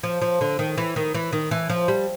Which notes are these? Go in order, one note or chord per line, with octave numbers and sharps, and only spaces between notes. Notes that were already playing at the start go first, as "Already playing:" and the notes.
F3
F3
D3
D#3
E3
D#3
E3
D#3
E3
F3
G3